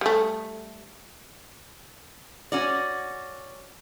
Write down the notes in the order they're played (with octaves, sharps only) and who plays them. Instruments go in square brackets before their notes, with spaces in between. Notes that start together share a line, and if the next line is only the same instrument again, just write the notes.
[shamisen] G3 A3
[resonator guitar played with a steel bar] C#4 F#4 D5